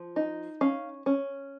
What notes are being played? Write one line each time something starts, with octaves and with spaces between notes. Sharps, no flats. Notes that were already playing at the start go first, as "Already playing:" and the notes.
Already playing: F3
D#4
C#4 F5
C#4